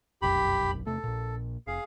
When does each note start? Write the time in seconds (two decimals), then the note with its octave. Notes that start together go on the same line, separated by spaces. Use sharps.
0.22 F1 B1 F#2 G4 B5
0.87 E2 C3 A3 A4
1.04 A#1 A#2
1.67 F1 G#4 F5